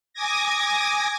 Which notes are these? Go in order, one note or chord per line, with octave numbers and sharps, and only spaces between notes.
G#5 D6 D#6 G#6 A#6